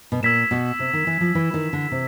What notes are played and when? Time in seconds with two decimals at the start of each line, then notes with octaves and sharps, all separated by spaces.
0.12 B2
0.23 A#2 E6 G#6 B6 E7
0.51 B2
0.79 C3
0.93 D#3
1.07 E3
1.21 F3
1.35 E3
1.54 D#3
1.73 D3
1.91 C3